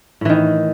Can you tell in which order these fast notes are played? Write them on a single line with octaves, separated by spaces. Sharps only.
A2 E3 D#3